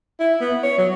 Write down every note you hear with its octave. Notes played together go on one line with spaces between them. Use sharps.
E4
B3
C#5
F#3